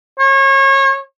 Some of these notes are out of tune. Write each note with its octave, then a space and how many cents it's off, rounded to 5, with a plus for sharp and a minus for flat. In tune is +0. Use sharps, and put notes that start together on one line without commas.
C#5 -30